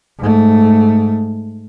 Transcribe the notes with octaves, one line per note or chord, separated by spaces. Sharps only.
G#2 A3